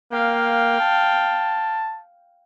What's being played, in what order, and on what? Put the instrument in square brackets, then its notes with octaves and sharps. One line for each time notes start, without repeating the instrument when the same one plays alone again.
[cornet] A#3 [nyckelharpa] F5 G5
[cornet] A5